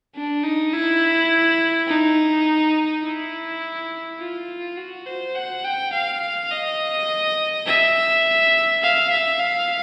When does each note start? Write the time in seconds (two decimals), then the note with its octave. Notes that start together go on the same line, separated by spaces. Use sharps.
0.15 D4
0.44 D#4
0.73 E4
1.88 D#4
3.04 E4
4.20 F4
4.77 F#4
5.06 C5
5.35 F#5
5.64 G5
5.93 F5
6.51 D#5
7.67 E5
8.82 F5
9.11 E5
9.39 F5